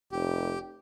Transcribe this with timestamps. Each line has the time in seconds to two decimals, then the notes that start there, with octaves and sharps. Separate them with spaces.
0.12 F1 G4